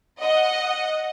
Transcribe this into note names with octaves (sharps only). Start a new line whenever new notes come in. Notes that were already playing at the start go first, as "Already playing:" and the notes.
D#5 F#5